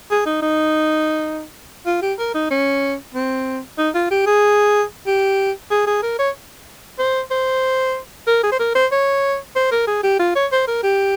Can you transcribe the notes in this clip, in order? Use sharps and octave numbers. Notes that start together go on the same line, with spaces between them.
G#4
D#4
D#4
F4
G4
A#4
D#4
C#4
C4
D#4
F4
G4
G#4
G4
G#4
G#4
A#4
C#5
C5
C5
A#4
G#4
C5
A#4
C5
C#5
C5
A#4
G#4
G4
F4
C#5
C5
A#4
G4